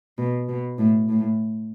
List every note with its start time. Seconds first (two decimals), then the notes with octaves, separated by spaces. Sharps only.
0.18 B2
0.49 B2
0.78 A2
1.09 A2